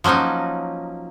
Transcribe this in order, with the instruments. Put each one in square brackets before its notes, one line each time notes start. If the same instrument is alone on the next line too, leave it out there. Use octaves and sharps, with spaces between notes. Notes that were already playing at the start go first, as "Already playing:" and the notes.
[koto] F3 F#3 A#3 C#4 D#4